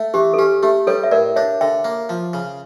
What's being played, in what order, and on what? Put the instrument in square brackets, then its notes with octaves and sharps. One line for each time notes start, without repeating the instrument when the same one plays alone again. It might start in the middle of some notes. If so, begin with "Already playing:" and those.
Already playing: [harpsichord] A3
[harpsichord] E3 [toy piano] G4
[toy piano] A4
[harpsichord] C#4 [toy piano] G4
[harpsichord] A3 [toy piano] G4
[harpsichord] G3 [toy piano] A4 C#5
[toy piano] E5
[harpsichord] A2 [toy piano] A#4 D5
[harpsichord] D4 [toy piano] C#5 E5
[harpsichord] D3 [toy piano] E5 G5
[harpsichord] A#3
F3
C#3